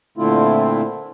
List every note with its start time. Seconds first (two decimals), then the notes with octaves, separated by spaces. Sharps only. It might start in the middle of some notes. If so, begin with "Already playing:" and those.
0.18 A#2 D3 A3 C4 E4 F4